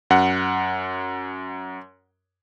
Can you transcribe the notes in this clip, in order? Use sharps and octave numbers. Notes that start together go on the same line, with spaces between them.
F#2 F#5